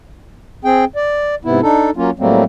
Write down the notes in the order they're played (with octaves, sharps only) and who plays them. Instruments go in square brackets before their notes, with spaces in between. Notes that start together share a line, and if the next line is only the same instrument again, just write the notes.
[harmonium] C4 G#4 G5
D5
G#2 C3 B3 E4
D4 D#4 A4
F#3 A#3 C#4 F4
A2 F#3 G3 A3 A#3 C4